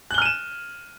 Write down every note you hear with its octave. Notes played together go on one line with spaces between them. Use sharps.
F6 F#6 D#7 E7 G7